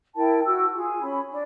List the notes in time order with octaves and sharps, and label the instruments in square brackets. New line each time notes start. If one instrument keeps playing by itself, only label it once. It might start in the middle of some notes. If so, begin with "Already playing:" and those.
[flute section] E4 A#4 G5 A5
F#4 E6
F4 G#4
C#4 B5
D4